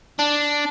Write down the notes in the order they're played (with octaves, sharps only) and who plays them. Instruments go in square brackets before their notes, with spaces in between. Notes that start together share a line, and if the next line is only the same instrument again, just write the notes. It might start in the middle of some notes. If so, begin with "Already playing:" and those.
[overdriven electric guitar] D4